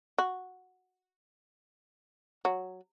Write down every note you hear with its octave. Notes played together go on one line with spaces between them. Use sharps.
F#4
F#3